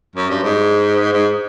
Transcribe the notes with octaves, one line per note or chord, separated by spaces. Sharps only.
F#2
G2
G#2
G#2